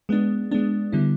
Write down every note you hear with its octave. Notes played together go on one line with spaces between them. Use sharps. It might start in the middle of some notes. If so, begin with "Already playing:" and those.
G#3 B3 D4
G#3 B3 D4
D3 G3 B3 E4